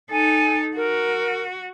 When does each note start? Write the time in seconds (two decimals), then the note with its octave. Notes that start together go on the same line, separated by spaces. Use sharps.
0.11 D#4 A4 G#5
0.76 F#4 A#4